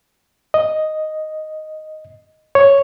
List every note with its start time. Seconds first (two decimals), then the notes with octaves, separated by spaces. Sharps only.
0.54 D#5
2.55 C#5